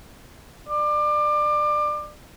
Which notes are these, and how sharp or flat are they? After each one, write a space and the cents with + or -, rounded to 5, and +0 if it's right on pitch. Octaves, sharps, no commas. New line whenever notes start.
D5 +25